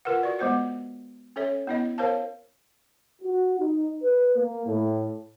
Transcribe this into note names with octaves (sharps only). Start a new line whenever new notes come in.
F4 A#4 B4 F#5
F#4 D5
G#3 B3 C5 F#5
C#4 A4 C#5 E5
B3 E4 D#5
A#4 C5 C#5 F5 A5
F#4
D#4
B4
A#3
A2